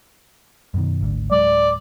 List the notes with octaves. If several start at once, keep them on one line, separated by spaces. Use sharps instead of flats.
F#2 B2 D#3
G#1 D2 D3
D1 F#3 G#3 D5